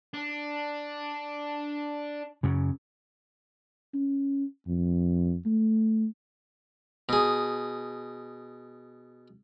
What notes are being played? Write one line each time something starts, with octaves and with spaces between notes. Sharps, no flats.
D4
F#2 C#3
C#4
F2
A3
B2 G#4